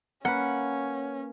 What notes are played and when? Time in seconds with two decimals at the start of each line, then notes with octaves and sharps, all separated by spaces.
0.25 A#3 C#4 B4 F#5